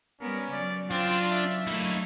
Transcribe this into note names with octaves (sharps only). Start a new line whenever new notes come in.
G3 B3 C#4 A#4
C#3 F#3 D5
C4 D4 F4
E5
F#3 A3 A#3 D#4 E4